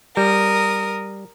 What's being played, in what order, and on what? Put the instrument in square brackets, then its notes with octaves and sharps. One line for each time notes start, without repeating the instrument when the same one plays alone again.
[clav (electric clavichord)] G3 [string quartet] A#4 D#6